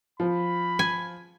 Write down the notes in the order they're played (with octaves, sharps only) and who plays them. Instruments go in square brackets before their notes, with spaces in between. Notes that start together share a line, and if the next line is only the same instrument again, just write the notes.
[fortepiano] F3 [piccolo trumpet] B5
[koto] G#5